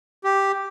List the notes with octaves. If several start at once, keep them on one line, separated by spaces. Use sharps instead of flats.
G4